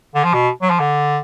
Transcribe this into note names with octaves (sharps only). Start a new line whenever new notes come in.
D3
F3
B2
F#3
F3
D3